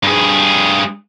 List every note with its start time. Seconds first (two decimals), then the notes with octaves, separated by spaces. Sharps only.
0.03 G2 G#4